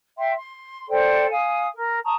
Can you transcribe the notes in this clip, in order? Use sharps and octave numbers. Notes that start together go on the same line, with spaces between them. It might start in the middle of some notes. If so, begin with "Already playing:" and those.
E5 G5 C6
C6
A4 C5 D5 G5
F5 G#5 D#6
A#4
A5 A#5 C#6 D#6